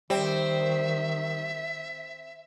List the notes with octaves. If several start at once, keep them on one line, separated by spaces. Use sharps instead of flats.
D#3 G3 C4 E5